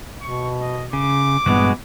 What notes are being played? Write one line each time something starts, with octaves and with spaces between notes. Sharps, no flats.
B2 C#6
D#5
C#3 D6
G2 A#2 E3 G#3 B3 F#4